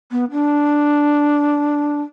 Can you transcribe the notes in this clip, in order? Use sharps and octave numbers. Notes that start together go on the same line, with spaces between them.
B3
D4